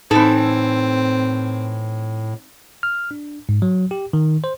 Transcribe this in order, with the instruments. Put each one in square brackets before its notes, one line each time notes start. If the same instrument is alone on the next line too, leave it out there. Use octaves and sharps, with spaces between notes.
[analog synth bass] A2 [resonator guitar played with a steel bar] E3 A4 [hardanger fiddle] C4 [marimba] D#4
[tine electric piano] F6
D4
G#2
F#3
G4
D#3
C5